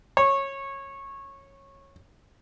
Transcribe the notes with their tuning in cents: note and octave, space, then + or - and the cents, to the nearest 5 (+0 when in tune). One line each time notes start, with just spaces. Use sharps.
C#5 -15